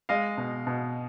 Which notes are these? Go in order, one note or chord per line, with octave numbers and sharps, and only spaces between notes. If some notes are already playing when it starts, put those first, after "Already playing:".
G#3 D#5 F5
B2
B2